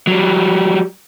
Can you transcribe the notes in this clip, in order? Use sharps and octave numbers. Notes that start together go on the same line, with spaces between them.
F#3 G3